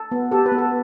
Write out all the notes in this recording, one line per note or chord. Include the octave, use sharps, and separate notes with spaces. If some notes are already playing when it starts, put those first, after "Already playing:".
Already playing: A4
B3
G4 A4
B4
B3
A4